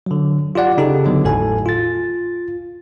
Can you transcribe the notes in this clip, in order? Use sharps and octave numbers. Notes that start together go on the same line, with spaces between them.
D3 F#3
F4 G4 D5 F#5
C#3 D#4 G4 A4
D3 F#3 B3
G#1 E2 A2 A4 G#5
F4 A6